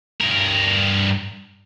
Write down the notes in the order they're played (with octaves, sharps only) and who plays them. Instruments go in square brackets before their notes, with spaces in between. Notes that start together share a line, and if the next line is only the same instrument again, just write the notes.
[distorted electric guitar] G2 A#4